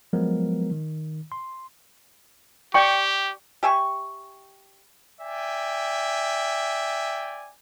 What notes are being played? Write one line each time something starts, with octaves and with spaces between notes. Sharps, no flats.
F3 F#3 G#3 B3 A#4
D#3
C6
G4 D5 G5 C#6
G4 E5 G#5 C#6
D5 E5 G5 G#5